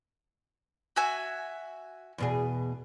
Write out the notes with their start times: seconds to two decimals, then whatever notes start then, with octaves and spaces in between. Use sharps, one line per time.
0.96 F#4 E5 G#5
2.18 E2 B2 G#4